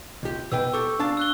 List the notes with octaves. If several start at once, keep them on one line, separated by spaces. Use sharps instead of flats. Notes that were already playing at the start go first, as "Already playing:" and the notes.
C#2 G4
B2 B4 G5 E6
G4 A4 C#6
D4 F5 A5
E6 F#6 G7